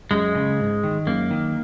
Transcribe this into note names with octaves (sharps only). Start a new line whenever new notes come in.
F#2 G#3
C#3
G#2
D#3
F#2 A#3
D#3